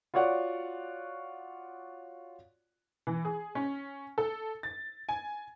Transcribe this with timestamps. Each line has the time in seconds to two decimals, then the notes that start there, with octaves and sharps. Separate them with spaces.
0.14 F4 F#4 C#5 D5 F#5
3.07 E3
3.25 G#4
3.55 C#4
4.18 A4
4.63 A6
5.09 G#5